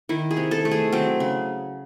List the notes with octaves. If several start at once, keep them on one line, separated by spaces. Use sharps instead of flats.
D#3 E4
G#4
C3
A4
A3
G#4
F#3 C4
C#3